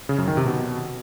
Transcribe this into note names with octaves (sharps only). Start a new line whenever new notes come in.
C#3
F#2
D#3
C3
B2